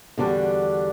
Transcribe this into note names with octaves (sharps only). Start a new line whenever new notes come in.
E2 D3 G3 D4 F#4